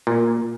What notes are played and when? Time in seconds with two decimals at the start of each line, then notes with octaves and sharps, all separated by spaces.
0.07 A#2